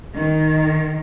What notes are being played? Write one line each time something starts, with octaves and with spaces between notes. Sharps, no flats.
D#3